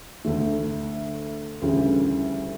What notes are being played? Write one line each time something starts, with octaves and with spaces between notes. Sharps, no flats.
D2 D3 A3
D2 C#3 E3 G3